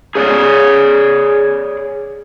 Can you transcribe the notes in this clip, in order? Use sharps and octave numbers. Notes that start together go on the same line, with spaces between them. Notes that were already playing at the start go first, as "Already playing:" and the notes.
G#4 C#5 D5